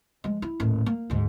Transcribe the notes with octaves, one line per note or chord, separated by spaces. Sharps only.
F3 G#3
E4
D#1 A2
A#3
D2 G#2